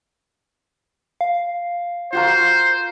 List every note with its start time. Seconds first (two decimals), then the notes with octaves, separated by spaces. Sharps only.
1.21 F5
2.13 F4 F#4 A#4 C5